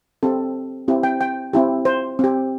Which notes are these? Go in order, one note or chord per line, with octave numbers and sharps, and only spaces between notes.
C4 G4 A4
C4 E4 G4
G5
G5
C4 E4 G4
C5
C4 G4